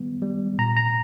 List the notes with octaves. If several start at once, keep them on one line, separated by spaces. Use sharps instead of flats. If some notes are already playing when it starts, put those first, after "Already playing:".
Already playing: D#3 G3 B3
G3
A#2 A#5
A#5